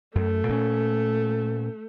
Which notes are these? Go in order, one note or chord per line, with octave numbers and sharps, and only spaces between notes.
F#2 A3
A#2 C4 C#4